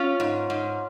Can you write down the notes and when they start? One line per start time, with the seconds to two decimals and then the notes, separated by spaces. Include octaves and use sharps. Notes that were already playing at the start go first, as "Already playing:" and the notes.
Already playing: C#4 F4
0.20 G#2
0.50 G#2